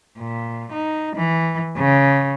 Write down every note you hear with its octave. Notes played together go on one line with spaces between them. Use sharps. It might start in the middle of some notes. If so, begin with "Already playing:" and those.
A#2
D#4
E3
C#3